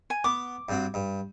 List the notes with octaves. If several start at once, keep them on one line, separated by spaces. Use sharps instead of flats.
G#5
B3 D6
G2 C4 F#4
G2